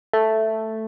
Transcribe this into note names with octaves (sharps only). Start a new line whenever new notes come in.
A3